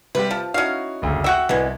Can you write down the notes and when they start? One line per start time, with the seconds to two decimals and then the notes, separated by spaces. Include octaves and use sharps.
0.15 C3 G3 G4 B4
0.31 F3 A5
0.54 C#4 D#4 E4 F#4 F5
1.02 F#1 D2
1.24 F#4 E5 G5 C#6 F#6
1.49 C2 B2 E3